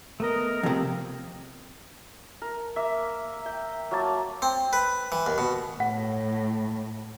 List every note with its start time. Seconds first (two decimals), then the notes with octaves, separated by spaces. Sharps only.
0.20 A3 B3 A#4 D#5
0.63 F2 C3
2.42 A#4
2.76 A#3 E5
3.46 G5
3.91 F#3 A#3 A5
4.42 C4
4.73 B4
5.12 E3
5.26 D#2
5.38 B2
5.80 A2 F#5